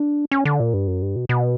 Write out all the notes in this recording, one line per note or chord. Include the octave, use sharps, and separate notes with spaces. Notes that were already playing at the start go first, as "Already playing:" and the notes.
Already playing: D4
C#4
D3
A#2
G2
F#2
G2
B2
B2